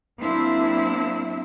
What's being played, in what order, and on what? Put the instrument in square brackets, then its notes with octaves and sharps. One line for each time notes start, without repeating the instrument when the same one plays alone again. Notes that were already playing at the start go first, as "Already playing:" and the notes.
[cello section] F#3 A#3 C4 D4 E4